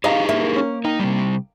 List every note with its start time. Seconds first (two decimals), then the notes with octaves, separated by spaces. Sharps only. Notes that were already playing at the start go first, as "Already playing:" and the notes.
0.04 D#4 G4 G#4 D#5 F5 A#5
0.29 A#3 E5
0.56 C#4
0.85 D#3 D#4
1.00 C3 G3